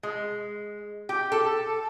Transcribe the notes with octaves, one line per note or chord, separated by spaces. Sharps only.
G#3
G4
A4